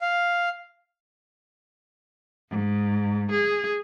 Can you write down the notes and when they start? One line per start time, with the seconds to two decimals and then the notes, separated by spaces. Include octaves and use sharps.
0.01 F5
2.49 G#2
3.31 G#4